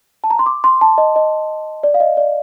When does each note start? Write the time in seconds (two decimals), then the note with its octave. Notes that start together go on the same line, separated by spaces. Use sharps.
0.24 A5
0.30 A#5
0.39 C6
0.46 D6
0.64 C6
0.81 A5
0.98 D#5
1.16 D#5
1.83 D5
1.94 F5
2.00 D#5
2.17 D5